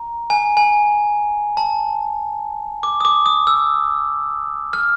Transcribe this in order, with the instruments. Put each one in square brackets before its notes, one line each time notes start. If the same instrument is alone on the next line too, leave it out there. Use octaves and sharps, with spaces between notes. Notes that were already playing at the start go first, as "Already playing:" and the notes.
Already playing: [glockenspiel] A#5
G#5
G#5
A5
D6
D#6
D6
D#6
E6
F6